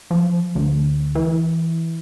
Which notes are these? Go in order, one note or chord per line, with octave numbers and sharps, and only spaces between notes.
F3
D2
E3